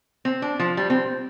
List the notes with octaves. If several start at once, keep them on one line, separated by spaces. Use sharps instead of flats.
C4
D4
F3
G3
C4